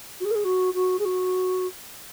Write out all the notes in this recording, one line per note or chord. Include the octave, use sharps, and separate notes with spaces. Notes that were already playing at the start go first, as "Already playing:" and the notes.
F#4
G#4
A#4
G#4
F#4
F#4
G#4
F#4